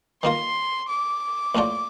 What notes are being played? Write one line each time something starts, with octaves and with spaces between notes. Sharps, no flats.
D#3 A#3 F4 A#4 C6
D6
A#1 A2 A3 D4 F4